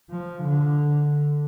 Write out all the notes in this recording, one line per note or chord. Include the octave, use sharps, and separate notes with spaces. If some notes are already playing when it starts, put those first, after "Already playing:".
F3
D3